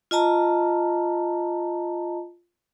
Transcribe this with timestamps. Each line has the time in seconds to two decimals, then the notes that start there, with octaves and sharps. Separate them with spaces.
0.11 F4 D#5 A5 A#5